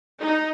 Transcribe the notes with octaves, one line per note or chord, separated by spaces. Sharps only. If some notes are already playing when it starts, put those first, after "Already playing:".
D#4